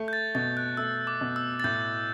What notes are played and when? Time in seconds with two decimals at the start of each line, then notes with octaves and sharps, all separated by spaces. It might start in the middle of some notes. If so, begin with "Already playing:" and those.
Already playing: A3
0.08 G6
0.13 A6
0.35 B2 A6
0.57 F#6
0.77 A3 E6
1.07 D6
1.21 B2
1.36 E6
1.60 A6
1.64 A2 G6